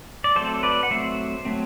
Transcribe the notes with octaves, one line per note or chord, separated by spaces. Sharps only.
D5
F#3 A3 C4 A4 C5
B4 D5
F#5
F#3 A3 C4 C5 E5
F#3 A3 C4